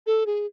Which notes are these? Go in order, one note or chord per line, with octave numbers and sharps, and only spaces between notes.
A4
G#4